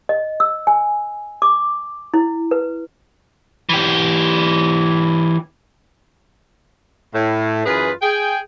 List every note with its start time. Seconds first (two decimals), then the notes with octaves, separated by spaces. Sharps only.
0.09 D#5
0.40 E6
0.67 G#5
1.42 D6
2.14 E4
2.51 B4
3.69 E3 G4
7.14 A2
7.66 F#2 E3 F4 G#4 B4
8.02 G#4 G5